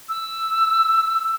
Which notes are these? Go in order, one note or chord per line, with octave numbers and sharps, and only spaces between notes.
E6